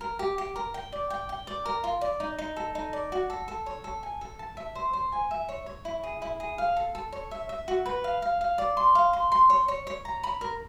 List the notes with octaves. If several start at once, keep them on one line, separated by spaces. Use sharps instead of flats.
A#4
G4
G4
A#4
G5
D5
G5
G5
D5
A#4
F4
D5
D#4
D#4
A4
D#4
D5
F#4
A4
A4
C#5
A4
G#5
A4
A5
E5
C5
C5
G#5
E5
C#5
C#5
E4
G#4
E4
G#4
F5
A4
A4
C#5
E5
E5
F#4
B4
F5
F5
F5
D5
C6
F5
C6
C6
C#5
C#5
C#5
A#5
B5
A#4